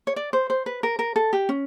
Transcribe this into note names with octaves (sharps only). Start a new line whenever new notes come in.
C#5
D5
C5
C5
B4
A#4
A#4
A4
G4
C#4